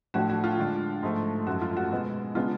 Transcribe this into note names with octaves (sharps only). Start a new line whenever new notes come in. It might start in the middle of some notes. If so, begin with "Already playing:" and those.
A2 F3 A3 D4 F#4
F#4
F4
D3 G#3 D4
G#2 F3 A3
F#2 F3 A3 F#4
F4
F#4
B2 G#3 B3
C#3 G#3 B3 D4 F4